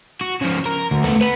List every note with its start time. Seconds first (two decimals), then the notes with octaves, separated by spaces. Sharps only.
0.21 F#4
0.41 C#3 F3
0.66 A#4
0.91 D2
1.04 A3 B3
1.21 B4 F#5